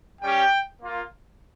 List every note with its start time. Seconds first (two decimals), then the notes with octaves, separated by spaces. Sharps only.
0.22 G3 C#4 G4 G5
0.80 A#3 F4